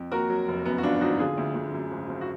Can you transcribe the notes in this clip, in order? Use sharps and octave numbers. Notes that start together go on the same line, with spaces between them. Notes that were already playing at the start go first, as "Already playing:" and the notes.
Already playing: F2
D#2 F#4 A#4
F#3
F1
F#2 B3
F#4
G#1 D4 F4
G#1 D#4 F#4
D3 F4 G#4
D2
D2
F#2
G#1
G#1
F#4